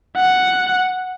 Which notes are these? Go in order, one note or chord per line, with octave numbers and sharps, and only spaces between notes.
F#5